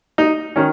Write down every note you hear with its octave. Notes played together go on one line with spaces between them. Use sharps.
D#4
D#3 C#4